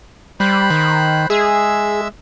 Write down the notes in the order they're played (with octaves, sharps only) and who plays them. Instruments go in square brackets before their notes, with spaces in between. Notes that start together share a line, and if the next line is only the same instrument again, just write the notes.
[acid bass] G3 [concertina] C5 B5 F#6
[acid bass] D#3
[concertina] G#3 E5 E6 [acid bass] G#4